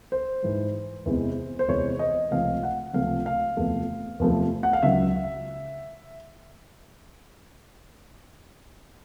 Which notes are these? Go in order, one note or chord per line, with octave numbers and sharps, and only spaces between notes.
C5
G#2 E3 G#3
E2 C3 E3 G#3
C5
E2 C3 E3 G#3 C#5
D#5
C#2 C3 F3 A3 F5
F#5
C#2 C3 F3 A3 F5
F5
E2 C3 F3 A3
E2 C3 F3 A3
F#5
F5
C#2 C#3 F#3 E5